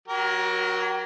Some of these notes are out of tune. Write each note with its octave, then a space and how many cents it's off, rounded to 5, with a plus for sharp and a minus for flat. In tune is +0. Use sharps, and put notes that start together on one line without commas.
F#3 +0 G4 -35 A#4 +25